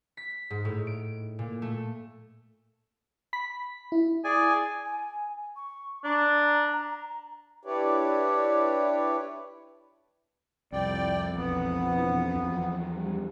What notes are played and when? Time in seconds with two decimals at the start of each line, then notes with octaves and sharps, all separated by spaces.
0.17 B6
0.50 G#2
0.65 A2
0.87 D7
1.39 A#2
1.62 A3
3.33 B5 B6
3.92 E4
4.24 G#4 D5 G#5
4.85 G#5
5.56 C#6
6.04 D4 A#5
7.65 D4 E4 G4 B4 C#5 D5
10.73 C2 F2 D5 G5
11.36 E1 B1 B3
11.90 B2 E3
12.35 E2 F3 F#3
12.97 G3